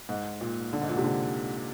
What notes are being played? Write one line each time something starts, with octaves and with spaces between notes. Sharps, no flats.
G#2
A#2
D3
G#2
A#2
C3
D3